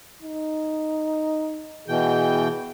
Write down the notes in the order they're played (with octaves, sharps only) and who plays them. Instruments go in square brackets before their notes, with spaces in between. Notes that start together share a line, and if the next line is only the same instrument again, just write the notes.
[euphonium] D#4
[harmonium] B2 E3 G5 [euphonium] G#4